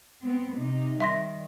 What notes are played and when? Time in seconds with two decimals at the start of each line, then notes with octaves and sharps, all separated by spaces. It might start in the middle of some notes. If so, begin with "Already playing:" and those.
0.22 B3 C4
0.56 C3 D#4
1.00 D#3 G3 E5 C6 A#6